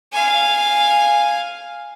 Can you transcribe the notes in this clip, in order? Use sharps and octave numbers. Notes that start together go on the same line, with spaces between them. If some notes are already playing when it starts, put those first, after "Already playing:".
F5 G#5